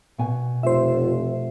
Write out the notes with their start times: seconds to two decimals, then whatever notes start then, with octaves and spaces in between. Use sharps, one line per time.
0.18 B2 G#5
0.63 F1 F4 C5 E5